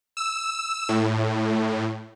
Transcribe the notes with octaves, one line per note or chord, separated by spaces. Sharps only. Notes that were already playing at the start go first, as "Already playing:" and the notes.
E6
A2